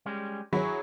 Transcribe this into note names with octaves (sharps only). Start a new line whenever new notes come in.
G3 G#3 C#4
F#3 E4 G#4 C#5